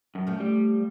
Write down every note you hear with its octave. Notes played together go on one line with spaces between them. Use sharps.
F#2
F3 A3
G3